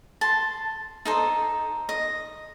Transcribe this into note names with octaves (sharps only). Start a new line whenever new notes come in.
A5 C6
D#4 A4 C5
D#5